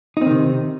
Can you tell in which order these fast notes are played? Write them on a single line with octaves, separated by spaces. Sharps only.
D#4 C4 D#3 C3